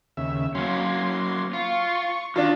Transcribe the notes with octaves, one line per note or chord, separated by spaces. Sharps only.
D#2 C#3 E5
F#3 A#3 C#4 C6
F4 C#6
D#3 D4 F4